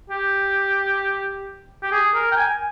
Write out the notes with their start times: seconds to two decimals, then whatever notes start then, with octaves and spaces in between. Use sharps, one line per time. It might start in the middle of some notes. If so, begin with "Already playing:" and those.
0.10 G4
1.82 G4
1.91 G#4
2.14 A#4
2.31 G5
2.36 G#5